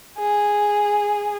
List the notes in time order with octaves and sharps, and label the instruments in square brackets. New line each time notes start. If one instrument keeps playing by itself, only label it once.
[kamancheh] G#4